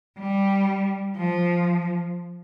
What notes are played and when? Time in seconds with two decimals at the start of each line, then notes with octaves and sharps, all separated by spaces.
0.19 G3
1.16 F3